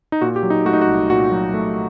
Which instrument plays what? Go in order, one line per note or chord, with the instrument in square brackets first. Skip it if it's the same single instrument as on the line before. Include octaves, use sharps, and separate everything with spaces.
[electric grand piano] D#4
A#2 F#4
G4
F#3
D#4
A3 F#4
D#4
F#4
C2
A#2 F#4
F#3
A3